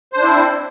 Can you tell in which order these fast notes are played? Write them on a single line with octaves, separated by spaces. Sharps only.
C5 D4 E4 C4